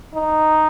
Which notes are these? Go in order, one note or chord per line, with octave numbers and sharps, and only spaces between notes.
D#4